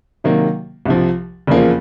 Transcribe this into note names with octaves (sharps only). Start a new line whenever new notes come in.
C3 D#3 F#3 A#3
C2 C3 F3
F1 E2 C#3 F3 A#3